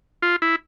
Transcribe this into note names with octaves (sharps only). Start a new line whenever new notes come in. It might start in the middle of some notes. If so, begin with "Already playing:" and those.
F4
E4